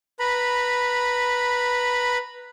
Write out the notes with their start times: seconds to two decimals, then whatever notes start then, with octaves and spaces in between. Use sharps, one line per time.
0.20 B4 A#5 B5